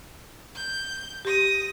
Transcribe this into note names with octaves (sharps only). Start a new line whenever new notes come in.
G6
G4 D#6 A#6